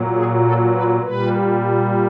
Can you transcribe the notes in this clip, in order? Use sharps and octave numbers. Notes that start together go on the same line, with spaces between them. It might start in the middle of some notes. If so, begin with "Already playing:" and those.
Already playing: A#2 F#3
G#4
A4
B4
A#2 G3 B4